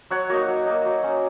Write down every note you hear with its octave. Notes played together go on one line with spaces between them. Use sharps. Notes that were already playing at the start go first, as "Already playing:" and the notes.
F#3 C#5 F#5
A#3 D#4 F#4
F#3
A#3 D#4
F#3
C#4